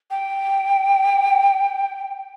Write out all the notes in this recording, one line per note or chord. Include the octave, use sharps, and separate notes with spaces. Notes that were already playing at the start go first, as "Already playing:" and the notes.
G5